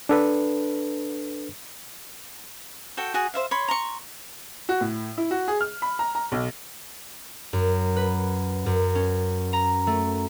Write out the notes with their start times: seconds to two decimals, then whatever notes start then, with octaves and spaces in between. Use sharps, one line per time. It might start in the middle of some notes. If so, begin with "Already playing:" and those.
0.09 D4 A4 B4
2.97 F#4 A4 G5
3.14 F#4 G#4
3.34 C5 E5 F5
3.51 C#5 B5 C6
3.68 A#5 C6 C#6
4.69 F#4
4.81 A2
5.18 E4
5.31 F#4
5.48 G#4
5.61 F6
5.82 B5
5.99 A#5
6.15 A#5
6.32 B1
7.53 F#2
7.96 B4
8.66 F#2
8.95 C#4
9.53 A#5
9.87 A3